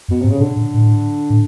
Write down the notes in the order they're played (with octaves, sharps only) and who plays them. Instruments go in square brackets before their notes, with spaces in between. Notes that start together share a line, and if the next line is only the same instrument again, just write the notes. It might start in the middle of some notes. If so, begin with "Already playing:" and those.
[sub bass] F#2 [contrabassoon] B2
[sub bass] G#2 [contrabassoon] C3
[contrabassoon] C#3
[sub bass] B2 [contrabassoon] D3
[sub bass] A#2
A2
A2